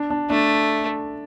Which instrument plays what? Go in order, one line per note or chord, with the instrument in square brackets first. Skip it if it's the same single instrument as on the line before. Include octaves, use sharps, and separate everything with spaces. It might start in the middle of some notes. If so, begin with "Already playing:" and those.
Already playing: [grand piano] D4
D4
[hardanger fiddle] A3 [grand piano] D4